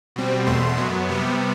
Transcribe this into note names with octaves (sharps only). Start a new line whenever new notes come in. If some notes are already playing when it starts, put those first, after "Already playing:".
B2 G3 C4
E2 B2 A3 C6
F#2 F#3 B3
C3 G3 B3